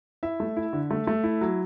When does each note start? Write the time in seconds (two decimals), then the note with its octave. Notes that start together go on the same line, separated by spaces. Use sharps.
0.23 E4 E5
0.40 A3
0.57 E4
0.73 D3
0.91 A3
1.07 A3
1.24 E4
1.41 F#3